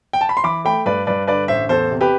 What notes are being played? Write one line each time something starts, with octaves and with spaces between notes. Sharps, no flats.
G5
A5
B5
C6
E3 B5 D6
A3 G5 B5
G2 B4 D5
G2 B4 D5
D3 B4 D5
A1 C5 E5
E2 A4 C5
C3
G4 B4